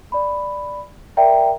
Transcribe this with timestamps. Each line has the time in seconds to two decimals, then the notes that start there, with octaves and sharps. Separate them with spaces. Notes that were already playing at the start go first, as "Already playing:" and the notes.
0.12 D5 B5
1.17 A#4 D5 E5 G5 A#5